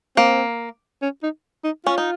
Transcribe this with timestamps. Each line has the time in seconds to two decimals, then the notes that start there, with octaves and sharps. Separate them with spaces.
0.17 A#3 C4
1.02 C#4
1.23 D#4
1.64 D#4
1.85 C#4 F4
1.98 D#4